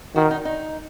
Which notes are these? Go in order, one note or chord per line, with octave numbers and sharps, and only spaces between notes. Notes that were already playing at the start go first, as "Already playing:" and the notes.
D#3 F#4
D#4
D#4